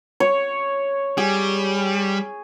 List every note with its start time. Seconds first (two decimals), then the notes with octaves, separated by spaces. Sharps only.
0.20 C#5
1.18 G3 G#4